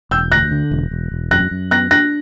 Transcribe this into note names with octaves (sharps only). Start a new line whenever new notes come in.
E1 E6 G6
D2 F#6 A#6
D3
E1
E1
E1
F#2 F#6 A#6
F#2
B3 F#6 A#6
D4 F#6 A#6